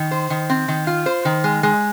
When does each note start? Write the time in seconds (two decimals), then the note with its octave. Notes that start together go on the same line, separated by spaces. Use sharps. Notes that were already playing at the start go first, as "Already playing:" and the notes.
Already playing: D#3
0.11 C5
0.30 D#3
0.50 C4
0.68 D#3
0.87 F4
1.06 C5
1.25 D#3
1.44 G#3
1.63 G#3